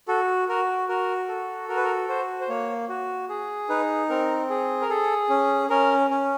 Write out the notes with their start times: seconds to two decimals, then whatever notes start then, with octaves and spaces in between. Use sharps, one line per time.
0.08 F#4 A4
0.48 F#4 A#4
0.89 F#4 A#4
1.29 A4
1.69 F#4 A#4
1.76 B4
1.84 A#4
2.09 F#4 C5
2.41 C5
2.49 A#3 C#5
2.89 F#4
3.29 G#4
3.69 D#4 B4
4.09 C4 A#4
4.50 G#4
4.82 A#4
4.89 G#4 A4
5.29 C#4
5.70 C#4 A#4
6.10 C#4